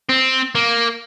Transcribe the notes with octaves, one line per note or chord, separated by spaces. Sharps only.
C4
A#3